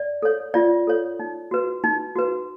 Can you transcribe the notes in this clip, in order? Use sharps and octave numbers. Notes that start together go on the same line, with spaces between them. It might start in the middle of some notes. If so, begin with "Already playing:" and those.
Already playing: D5
A4 C#5
F4 D5
A4 C#5
D#4
F#4 B4
D#4
F#4 B4